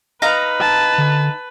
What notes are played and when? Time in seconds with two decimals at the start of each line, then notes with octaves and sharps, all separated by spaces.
0.22 D#4 B4 F5 A#5
0.60 A5
0.98 D3